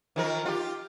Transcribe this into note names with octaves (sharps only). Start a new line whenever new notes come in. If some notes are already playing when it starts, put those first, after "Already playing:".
D#3 F3 A#4
F4 G4